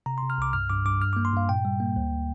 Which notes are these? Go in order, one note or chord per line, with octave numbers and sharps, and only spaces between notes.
C3 A#5
C3 C6
F6
C2 D6
G2 F6
G2 D6
G2 D6
G2 F6
A#3 D6
C6
G2 F5
A#2 G5
G3
A#3
D2